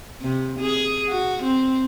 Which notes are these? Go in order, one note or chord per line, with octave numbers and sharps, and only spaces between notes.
C3
G#4
F#4
C4